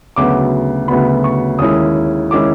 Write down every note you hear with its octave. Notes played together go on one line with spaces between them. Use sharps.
D2 C#3 F#3 B3 D6
D2 C#3 F#3 B3 B5
C#6
D#2 D#3 G#3 C#4 E4 D#6
D#3 G#3 C#4 E4 D6